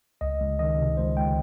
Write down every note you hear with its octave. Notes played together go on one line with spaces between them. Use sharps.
C#2 D#5
C#2
D#3 D#5
C3
C#2 C5
C#2 G5